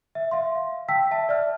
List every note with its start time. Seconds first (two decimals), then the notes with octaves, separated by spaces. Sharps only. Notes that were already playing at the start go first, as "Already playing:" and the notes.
0.15 E5
0.31 E5 F5 C6
0.55 F5
0.89 G5 A5 E6 B6
1.11 E5 A5
1.29 D5 E5 F6